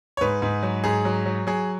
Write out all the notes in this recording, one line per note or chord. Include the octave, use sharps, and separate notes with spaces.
C#5
G#2 B4
G#2
F#3
G#2 G#4
F#3
F#3
F#3 G#4